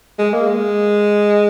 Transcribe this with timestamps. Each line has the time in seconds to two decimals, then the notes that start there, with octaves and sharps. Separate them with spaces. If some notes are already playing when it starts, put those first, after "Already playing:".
0.19 G#3
0.33 A#3
0.47 G#3